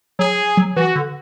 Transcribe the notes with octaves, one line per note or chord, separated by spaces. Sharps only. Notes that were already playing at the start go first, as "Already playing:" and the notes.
F#3 G#4
F#3
E3 F#4
D3